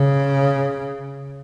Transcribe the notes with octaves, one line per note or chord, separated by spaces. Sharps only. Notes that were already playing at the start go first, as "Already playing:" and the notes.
Already playing: C#3